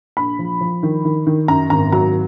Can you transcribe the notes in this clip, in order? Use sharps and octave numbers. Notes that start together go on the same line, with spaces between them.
A#1 B5
F3
F3
D#3
D#3
D#3
F#2 A#5
G#1 A#5
F#3 A#5